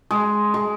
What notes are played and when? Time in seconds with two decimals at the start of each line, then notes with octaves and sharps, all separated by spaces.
0.11 G#3
0.54 G#3